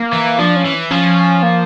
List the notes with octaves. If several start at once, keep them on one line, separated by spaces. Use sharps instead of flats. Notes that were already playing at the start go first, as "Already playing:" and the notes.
Already playing: A#3
E3
F3 D4
C#4
E3
F3 C#4
A#3